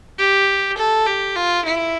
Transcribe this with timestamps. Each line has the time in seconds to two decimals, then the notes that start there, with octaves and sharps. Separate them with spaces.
0.19 G4
0.77 A4
1.07 G4
1.36 F4
1.65 E4